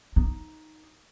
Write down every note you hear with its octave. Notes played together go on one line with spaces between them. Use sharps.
D#4